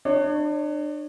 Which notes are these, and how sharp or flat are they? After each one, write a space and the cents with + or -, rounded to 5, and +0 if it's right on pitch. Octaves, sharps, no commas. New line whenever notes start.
D4 +35 C#5 +0